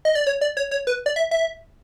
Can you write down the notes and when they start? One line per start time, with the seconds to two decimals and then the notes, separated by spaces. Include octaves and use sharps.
0.05 D#5
0.15 D5
0.27 C#5
0.41 D5
0.57 C#5
0.71 C#5
0.87 B4
1.06 D5
1.16 E5
1.31 E5